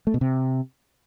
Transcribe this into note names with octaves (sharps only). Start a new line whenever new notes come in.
A3
B2
C3